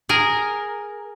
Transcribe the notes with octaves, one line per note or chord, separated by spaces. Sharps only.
G#4 A#4